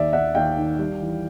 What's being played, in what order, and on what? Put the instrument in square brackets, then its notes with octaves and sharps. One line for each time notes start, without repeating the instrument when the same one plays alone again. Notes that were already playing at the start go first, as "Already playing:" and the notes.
Already playing: [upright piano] D#2 D5 E5
D#2 E5 F#5
D#2 F5 G5
D#3
G3
E3